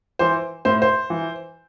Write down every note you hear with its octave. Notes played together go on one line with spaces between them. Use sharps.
E3 C5
A2 C5
C5
E3